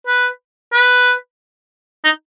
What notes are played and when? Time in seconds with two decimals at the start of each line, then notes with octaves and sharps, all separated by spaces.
0.07 B4
0.73 B4
2.04 D#4